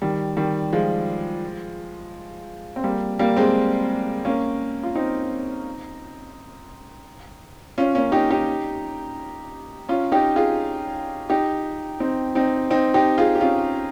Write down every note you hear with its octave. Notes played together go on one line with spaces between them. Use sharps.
D#3 G3
D#3 G3
F3 G#3
C4
G3 A#3
G3 A#3
G#3 C4
A#3 C#4
F4
C4 D#4
C#4 F4
A#3 C#4
D#4 G4
D#4 G4
C#4 F4
D#4 G4
F4 G#4
D#4 G4
C4 D#4
C4 D#4
C4 D#4
D#4 G4
F4 G#4
G4
C#4 F4